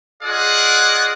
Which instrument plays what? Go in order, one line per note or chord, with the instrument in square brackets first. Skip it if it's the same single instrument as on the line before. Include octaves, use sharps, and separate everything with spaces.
[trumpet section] F4 G#4 D5 D#5 F#5